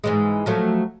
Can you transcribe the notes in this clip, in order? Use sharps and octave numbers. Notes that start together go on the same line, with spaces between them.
G#2 E3 G#3
F3 F#3 A3